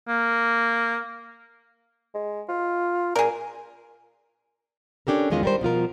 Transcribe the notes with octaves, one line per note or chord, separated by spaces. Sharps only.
A#3
G#3
F4
A#2 G#4 A#4
C#4 D4 G4 A4 A#4
E2 D#3 G#3 C#4 F4 D#5
G3 A#4 C5
B2 F3 F4 A#4